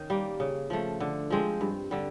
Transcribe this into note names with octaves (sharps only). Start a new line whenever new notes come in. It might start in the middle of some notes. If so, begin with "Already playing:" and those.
Already playing: D#3 C#4
G3 A#3
C#3
F3 A3
D3
F3 G#3 C4
G2
D3 G3